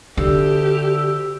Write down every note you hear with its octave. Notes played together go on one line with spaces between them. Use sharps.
D2 D3 G4 E6